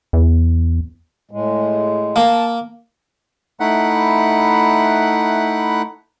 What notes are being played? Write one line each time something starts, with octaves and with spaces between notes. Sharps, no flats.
E2
A2 G#3
A#3 A5
A3 D#4 E4 F#5 B5 F#6